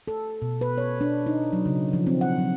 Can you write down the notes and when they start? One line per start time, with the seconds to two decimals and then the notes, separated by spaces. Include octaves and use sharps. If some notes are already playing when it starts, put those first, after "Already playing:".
0.08 A4
0.42 B2
0.61 B4
0.78 C#5
1.01 D4
1.27 D#4
1.53 F#3
1.66 C#3
1.93 F3
2.07 C4
2.21 F#5
2.38 F#3